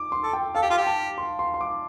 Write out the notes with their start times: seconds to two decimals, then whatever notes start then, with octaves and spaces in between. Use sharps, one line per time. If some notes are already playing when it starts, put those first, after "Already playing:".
Already playing: D6
0.12 C6
0.23 A4
0.33 G5
0.55 A4 F5
0.62 G4
0.70 F4
0.77 G4
0.87 A5
1.18 C6
1.39 C6
1.54 C6
1.61 D6